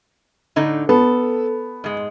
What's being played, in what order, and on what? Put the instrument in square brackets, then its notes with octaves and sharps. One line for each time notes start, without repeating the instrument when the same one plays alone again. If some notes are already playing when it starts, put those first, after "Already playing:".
[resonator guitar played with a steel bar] A2 D3 D#4
[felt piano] B3 [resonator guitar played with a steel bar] A4
[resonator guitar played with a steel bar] G#2 G#3